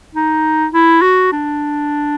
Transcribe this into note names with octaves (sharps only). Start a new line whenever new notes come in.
D#4
E4
F#4
D4